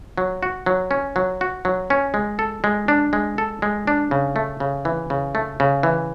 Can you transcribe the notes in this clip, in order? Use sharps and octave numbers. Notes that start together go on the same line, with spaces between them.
F#3
F#4
F#3
C#4
F#3
F#4
F#3
C#4
G#3
A4
G#3
D4
G#3
A4
G#3
D4
C#3
A3
C#3
E3
C#3
A3
C#3
E3